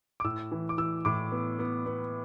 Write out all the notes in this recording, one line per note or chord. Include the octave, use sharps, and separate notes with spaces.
D6
A2 E6
E3
D6
E3 E6
A2 D6
B3
B3
B3